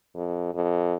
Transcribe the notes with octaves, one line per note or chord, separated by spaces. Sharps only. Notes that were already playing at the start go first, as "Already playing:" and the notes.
F2
F2